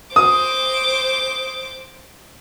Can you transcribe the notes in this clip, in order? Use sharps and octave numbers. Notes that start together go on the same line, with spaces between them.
C5 D6 D#6